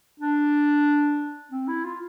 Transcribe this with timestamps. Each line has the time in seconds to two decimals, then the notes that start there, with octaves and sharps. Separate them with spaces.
0.20 D4
1.52 C4
1.68 E4
1.85 F4